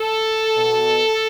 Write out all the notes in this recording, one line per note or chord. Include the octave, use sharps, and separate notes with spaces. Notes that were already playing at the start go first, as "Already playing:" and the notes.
Already playing: A4
B2